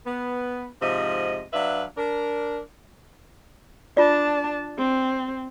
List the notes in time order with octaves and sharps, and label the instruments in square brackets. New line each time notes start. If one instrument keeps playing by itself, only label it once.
[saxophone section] B3
G#2 C3 F3 D#5
F#3 D4 B4 E5 F5
D4 A#4
[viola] D4 A5 [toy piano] F4 D5
[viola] C4